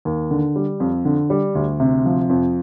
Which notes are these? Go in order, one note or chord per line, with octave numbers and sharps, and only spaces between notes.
D#2
D3
G3
F2
D3
G3
D2
C3
F3
F2